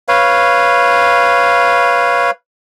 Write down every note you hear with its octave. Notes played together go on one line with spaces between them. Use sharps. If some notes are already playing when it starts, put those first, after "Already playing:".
B4 C#5 F5